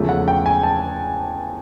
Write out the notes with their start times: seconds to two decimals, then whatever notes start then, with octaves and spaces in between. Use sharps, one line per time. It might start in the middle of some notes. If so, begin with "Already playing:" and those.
Already playing: E2 C#3 F3 A3
0.09 F#5
0.28 G5
0.46 G#5
0.63 A5